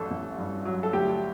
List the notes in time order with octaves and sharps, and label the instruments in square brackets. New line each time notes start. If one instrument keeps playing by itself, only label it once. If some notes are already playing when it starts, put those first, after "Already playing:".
Already playing: [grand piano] A1 G2 F#3 A4
A1
G2
F#3
A4
D2 G4